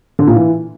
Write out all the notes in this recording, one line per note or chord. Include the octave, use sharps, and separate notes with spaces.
D3
A#2
E3